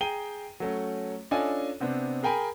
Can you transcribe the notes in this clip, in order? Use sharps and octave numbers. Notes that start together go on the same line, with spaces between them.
G#4 G5 A#5 D#7 G7
F#3 A3 C#4
C#4 D4 F4 A4 D#5 G#5
C3 B3 C4 D4
G#4 A#4 G5 G#5 B5